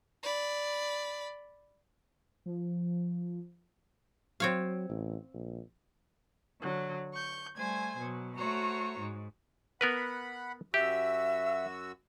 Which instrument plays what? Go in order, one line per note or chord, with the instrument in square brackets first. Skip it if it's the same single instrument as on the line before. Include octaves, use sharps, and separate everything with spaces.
[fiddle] D5 B5
[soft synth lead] F3
[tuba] F#3 [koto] C4 C#5 F5
[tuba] A1
A#1
[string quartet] D3 F#3
C#6 G6
G3 A3 C5 G#5 G#6
B2 F#3
A3 F#4 C5 C#5 A#5
G#2
[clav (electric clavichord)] B3 A#4 B4 [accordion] F#5 B5
[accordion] F#2 F#4 E6 [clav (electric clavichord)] G4 [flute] E5